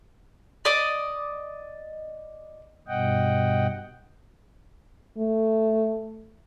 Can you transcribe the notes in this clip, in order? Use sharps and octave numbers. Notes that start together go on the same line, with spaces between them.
D5 D#5 D6
G2 B2 D#5 F#5 G5
A3